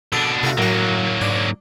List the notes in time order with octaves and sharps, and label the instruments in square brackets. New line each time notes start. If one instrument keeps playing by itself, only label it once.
[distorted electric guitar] B2 D4 [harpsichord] A4
[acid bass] C3 [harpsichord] A3 F4 F#4
[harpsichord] F#2 F#4 [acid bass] A2 [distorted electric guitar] F#3 A#3
[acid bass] G#2 [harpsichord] D4